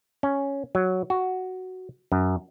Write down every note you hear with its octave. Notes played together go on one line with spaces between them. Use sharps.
C#4
F#3
F#4
F#2